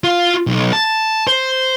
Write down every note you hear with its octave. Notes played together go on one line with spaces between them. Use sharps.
F4 F5
B1
A5
C5